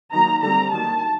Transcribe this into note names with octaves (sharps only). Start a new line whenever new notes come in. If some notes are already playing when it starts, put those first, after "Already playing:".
D#3 F#3 A#3 A#5
D3 G3 C4 A#5
D#3 F#3 A#3 A5